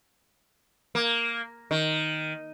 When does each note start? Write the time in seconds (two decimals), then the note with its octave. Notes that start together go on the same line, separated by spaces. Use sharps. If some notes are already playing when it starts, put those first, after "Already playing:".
0.95 A#3
1.71 D#3